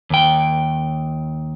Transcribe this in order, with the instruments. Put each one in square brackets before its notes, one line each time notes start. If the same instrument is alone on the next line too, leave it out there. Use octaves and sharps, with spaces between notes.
[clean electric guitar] D#2 G5